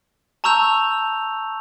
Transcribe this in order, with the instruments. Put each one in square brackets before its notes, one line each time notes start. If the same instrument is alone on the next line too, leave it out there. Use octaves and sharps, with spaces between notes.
[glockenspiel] A5 A#5 C#6 E6 G6 F7